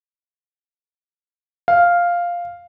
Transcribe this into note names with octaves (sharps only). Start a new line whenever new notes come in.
F5